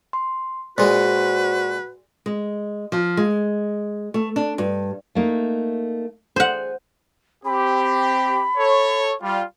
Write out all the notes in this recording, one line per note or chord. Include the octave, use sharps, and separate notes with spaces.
C6
A#2 G#3 F#4 B4 C5
G#3
F3
G#3
A3
D4
G2
A3 A#3 D#4
G#4 C5 F#5
C4 G4 B5
A4 C#5
G3 F4